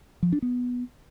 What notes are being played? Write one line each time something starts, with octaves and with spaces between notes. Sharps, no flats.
F3
D4
B3